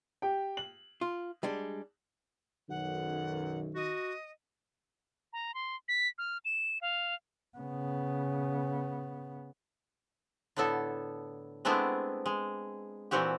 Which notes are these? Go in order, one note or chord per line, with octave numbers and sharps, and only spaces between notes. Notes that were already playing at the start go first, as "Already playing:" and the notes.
G4 G5
F#7
F4
G3 G#3 D4
B1 F#2 D#3 F#5
F#4 D#5
A#5
C6
B6
F6
E7
F5
C#3 B3
A2 D3 B3 E4 A4
G#3 A3 B3 C4 D4 E4
G#3
A#2 E3 C4 F#4 G4